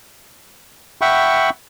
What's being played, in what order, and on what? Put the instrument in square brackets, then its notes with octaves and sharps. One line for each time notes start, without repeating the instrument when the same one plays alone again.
[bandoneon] E5 F#5 G5 B5 C#6